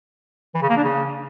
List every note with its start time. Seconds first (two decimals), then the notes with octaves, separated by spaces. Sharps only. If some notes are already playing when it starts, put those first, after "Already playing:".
0.54 E3
0.62 C#3
0.69 A#3
0.77 D4
0.84 C#3